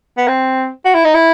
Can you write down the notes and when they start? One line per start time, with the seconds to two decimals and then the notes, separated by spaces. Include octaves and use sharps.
0.18 B3
0.28 C4
0.85 F#4
0.95 E4
1.05 D#4
1.14 E4